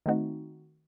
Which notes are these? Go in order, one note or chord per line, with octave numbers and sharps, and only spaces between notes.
D#3 A3 C4 D#4 F#4